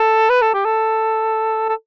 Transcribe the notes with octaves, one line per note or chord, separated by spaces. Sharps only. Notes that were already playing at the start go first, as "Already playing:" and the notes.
Already playing: A4
B4
A4
G4
A4
A4